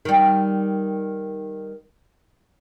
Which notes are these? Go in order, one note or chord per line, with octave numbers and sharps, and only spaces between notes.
D#3 G3